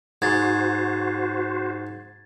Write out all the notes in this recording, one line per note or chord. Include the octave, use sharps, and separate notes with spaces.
G#2 F#4 C5 G#6 A6